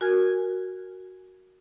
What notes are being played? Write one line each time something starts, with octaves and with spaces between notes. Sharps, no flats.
F#4 A#4 G#5 F6 G#6